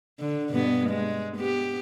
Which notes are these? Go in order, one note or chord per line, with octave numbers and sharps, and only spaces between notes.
D3
G2 B2 B3
G#3
B3 G4